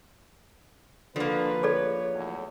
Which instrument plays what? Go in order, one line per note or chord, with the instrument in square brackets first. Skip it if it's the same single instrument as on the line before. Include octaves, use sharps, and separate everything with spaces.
[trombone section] A1 B4 [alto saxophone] D3 [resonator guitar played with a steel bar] F3 A#3
[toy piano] G#4 A4 D5 [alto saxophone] C#5
[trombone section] B1 E2 A2